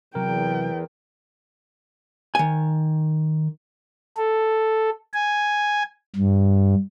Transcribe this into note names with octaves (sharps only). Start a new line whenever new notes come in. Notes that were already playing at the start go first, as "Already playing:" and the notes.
E2 C3 F#3 A#4 G5
D#3 G#5
A4
G#5
G2